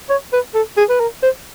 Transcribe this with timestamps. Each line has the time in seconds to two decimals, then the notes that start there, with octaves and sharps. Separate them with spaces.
0.10 C#5
0.33 B4
0.55 A4
0.77 G#4
0.89 B4
1.00 A#4
1.23 C5